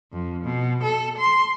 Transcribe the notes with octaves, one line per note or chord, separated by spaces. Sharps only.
F2
B2
A4
C6